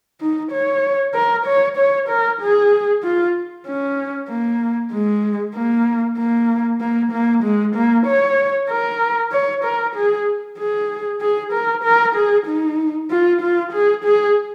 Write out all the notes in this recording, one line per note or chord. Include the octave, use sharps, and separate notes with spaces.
D#4
C#5
A#4
C#5
C#5
A#4
G#4
F4
C#4
A#3
G#3
A#3
A#3
A#3
A#3
G#3
A#3
C#5
A#4
C#5
A#4
G#4
G#4
G#4
A#4
A#4
G#4
D#4
F4
F4
G#4
G#4